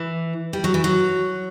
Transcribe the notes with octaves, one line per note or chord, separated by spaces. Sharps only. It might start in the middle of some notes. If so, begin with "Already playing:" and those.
Already playing: E3
G3
F#3
E3
F#3